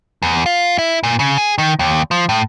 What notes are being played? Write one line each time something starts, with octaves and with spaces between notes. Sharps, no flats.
E2
F4
E4
A#2
C#3
G#4
D#3
D#2
F3
A2